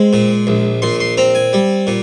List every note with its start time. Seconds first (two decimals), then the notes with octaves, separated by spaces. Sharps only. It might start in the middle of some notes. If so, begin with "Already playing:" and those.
Already playing: G#3 C4
0.13 A#2
0.47 A#1
0.82 A#2 C6
1.00 C6
1.17 C4 A#5
1.35 G#5
1.53 G3
1.87 A#2